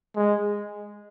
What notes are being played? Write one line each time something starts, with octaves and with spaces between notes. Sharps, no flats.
G#3